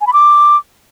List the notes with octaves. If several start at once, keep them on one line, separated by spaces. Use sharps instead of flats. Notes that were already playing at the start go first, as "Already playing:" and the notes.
G#5
B5
D6